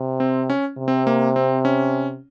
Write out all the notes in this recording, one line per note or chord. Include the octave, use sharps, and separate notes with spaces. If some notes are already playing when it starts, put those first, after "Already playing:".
Already playing: C3
C4
C#4
C3
C4
A#3
C4
C#4